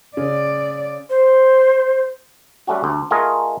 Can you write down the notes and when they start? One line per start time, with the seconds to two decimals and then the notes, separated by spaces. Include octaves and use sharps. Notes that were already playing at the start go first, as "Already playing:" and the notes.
0.17 C#3 D5
1.10 C5
2.67 G3 A3 C#4 F#4
2.84 D2
3.11 A3 F4 G#4 A#4 D#5